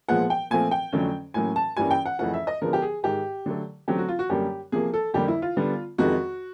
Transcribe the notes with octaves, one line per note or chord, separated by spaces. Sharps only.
A#2 F3 G#3 B3 F#5
G5
A#2 F3 A3 C4 G#5
G5
F2 D3 F#3 A3 C#4
A2 F#3 A#3 C#4 G#5
A5
G2 E3 G3 A#3 C#4 G#5
G5
F#5
F2 C#3 E3 A3 C#4 F#5
E5
D#5
D3 F3 G#3 B3 A#4
G4
G#4
G#2 D#3 G#3 G4
D3 F#3 A3
D3 F#3 A3 C4 G4
F#4
F4
F#4
F#2 D3 G3 A#3 G4
C3 F3 A#3 G#4
A4
F2 D3 G3 A#3 G4
E4
F4
D3 G3 B3
F2 C3 D#3 G#3 F#4